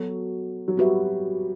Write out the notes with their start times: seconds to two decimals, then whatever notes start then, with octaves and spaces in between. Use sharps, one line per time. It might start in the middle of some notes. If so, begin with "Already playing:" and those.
Already playing: F#3 B3 F#4 A4
0.68 F#3
0.77 G3 C4 F#4 B4 E5